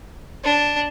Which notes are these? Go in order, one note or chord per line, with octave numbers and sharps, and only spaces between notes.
D4